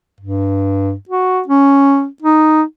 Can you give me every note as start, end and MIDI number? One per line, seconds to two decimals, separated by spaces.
0.20 0.94 43
1.09 1.41 66
1.47 2.06 61
2.22 2.62 63